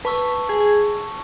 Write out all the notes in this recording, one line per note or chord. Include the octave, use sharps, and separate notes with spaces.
B4 A5 C#6 E6
G#4
G#4